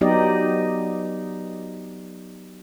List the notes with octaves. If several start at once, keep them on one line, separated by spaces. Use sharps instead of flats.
F#3 B3 D#4 G4 D5 D#5